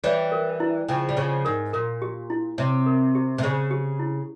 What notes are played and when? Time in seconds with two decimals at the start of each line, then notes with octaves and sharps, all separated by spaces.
0.04 E3 G3 C#5
0.32 A#4
0.60 E4
0.88 C#3 F3 G5
1.09 G3
1.17 C#3 F3 C#5
1.45 G#2 A#4
1.73 A#2 A#4
2.02 G4
2.30 E4
2.58 C3 C#5
2.86 A#4
3.15 G4
3.38 C3
3.43 C#3 C5
3.71 G4
3.99 E4